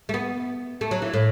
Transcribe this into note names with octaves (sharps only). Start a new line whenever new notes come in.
A3
B3
A3
F#3
E3
A2